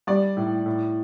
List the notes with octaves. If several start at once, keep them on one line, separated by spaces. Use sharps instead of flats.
G3 D5
A2
A2